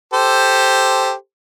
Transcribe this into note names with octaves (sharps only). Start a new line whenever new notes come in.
G4 A4 C5